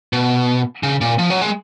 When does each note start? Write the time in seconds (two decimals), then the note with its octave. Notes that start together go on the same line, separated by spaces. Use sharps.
0.13 B2
0.83 C#3
1.01 A#2
1.19 F3
1.30 F#3
1.42 G#3